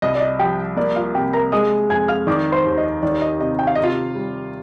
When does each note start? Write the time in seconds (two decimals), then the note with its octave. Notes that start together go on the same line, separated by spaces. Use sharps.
0.02 C2 D#5
0.15 D5
0.21 D#5
0.39 F3 G4 G5
0.77 A#3 D5
0.96 F4 F5
1.14 C3 G4 G5
1.33 A#4 A#5
1.52 G#3 D#5 D#6
1.89 F2 G#5 G#6
2.08 F5 F6
2.27 D#3 D5 D6
2.52 C5 C6
2.65 D#2
2.77 D#5
3.03 D#3 D5
3.22 D#5
3.40 C3 D#5
3.59 G5
3.67 F5
3.75 C3 D#5
3.83 F4 F5
4.15 G3